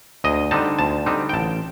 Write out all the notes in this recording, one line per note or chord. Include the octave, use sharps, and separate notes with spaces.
D2 D#5
D3 G3 C4 D#4 A5
D2 A5
D3 G3 C4 D#4
G5
A1 A5